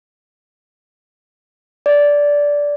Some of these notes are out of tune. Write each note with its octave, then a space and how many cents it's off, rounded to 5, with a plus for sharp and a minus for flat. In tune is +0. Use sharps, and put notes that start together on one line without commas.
D5 -10